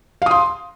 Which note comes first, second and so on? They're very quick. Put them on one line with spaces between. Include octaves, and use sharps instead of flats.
F5 D#6 C6